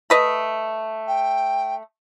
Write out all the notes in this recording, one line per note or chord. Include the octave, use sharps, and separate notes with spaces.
A3 B4 D#5
G5